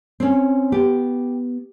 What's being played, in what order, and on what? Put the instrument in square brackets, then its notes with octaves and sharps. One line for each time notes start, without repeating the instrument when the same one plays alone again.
[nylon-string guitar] C4 C#4
[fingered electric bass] B3 [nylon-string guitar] G4